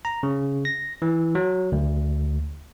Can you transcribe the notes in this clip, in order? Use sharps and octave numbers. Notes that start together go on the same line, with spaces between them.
A#5
C#3
A#6
E3
F#3
D2